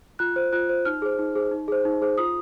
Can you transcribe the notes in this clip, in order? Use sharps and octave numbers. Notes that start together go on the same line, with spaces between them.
F4 F#6
C5
F4 F#6
C5
D#4 F6
G#4 C5
D#4
G#4 C5
D#4
G#4 C5
D#4
G#4 C5
F4 D#6